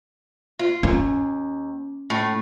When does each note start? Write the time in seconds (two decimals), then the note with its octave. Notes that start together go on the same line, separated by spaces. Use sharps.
0.59 F4
0.83 D#2 C#4
2.10 A2